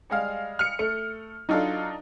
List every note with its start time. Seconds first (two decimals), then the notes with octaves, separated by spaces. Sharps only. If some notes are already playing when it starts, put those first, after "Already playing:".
0.10 G3 G#3 F5
0.59 F6 C#7
0.79 A3 C#7
1.49 F#3 D4 D#4 F4 A4